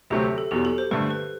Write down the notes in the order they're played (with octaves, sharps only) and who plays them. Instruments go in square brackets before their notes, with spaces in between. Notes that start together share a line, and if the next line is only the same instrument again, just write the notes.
[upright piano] D2 C3 F#3 A3 C4 [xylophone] G4
[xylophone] A4
A4
[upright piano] E2 B2 F#3 [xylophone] G4
[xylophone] A4
C5
[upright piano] G2 D3 A3 [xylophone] B4
[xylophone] B4